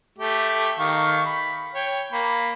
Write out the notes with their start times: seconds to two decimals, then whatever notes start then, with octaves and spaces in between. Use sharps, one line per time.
0.18 A3 G4
0.79 D#3 F5 C#6
1.26 B5
1.74 C#5 G5
2.12 A#3 B5